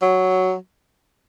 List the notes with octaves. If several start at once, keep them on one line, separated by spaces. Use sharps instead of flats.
F#3